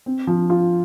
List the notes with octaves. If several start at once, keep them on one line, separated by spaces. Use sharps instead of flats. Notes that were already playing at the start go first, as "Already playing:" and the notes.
C4
F3
F4